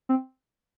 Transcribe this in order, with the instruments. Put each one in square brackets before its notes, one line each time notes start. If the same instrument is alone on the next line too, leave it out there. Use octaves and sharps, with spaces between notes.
[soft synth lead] C4